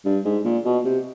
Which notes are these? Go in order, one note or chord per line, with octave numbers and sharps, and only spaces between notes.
G2
G#2
A#2
B2
C3